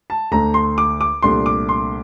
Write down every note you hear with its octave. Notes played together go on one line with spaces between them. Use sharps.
A5
D2 D3 A3 D4 A#5
C6
D6
D6
C2 A#2 A3 D4 C6
D6
C6